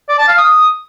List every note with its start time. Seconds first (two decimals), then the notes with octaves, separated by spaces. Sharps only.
0.09 D5
0.19 A5
0.28 F5
0.38 D#6